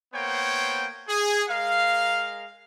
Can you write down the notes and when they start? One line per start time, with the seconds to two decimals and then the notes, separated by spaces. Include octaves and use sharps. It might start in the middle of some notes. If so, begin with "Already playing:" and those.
0.14 A#3 B3 C5 C#5 G5
1.08 G#4
1.49 G#3 A#4 F5